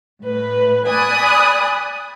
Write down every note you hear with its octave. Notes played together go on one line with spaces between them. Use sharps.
A2 B4
D5 G#5 B5 D#6 F#6